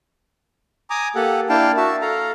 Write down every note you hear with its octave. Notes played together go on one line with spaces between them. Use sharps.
G#5 A#5 D6 D#6
A#3 G4 A4 F#5
A#3 D4 E4 F5 G5 A5
F#4 E5 A5
A4 F5 A#5